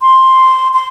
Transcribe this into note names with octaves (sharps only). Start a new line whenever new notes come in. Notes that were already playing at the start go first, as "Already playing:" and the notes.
C6
C6